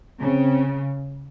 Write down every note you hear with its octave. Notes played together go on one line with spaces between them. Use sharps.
C#3 C4